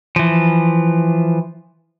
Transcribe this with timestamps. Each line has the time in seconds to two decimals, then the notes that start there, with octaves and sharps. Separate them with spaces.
0.16 E3 F3